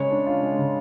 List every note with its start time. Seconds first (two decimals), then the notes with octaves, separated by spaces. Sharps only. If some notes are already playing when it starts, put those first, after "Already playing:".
Already playing: C#3 G#3 C#5
0.11 D4
0.26 F4
0.43 G#3
0.59 C#3